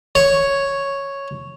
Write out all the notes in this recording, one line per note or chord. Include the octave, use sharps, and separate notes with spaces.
C#5